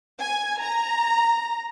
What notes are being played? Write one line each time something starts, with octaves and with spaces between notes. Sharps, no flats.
G#5
A#5